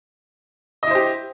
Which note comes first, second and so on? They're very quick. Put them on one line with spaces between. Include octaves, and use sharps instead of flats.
D#5 E4 C5 G4